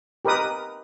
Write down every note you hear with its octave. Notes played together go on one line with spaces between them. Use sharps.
G4 A#4 B4 D#5 D#6